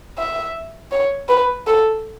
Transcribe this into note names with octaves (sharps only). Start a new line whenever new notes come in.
E5
C#5
B4
A4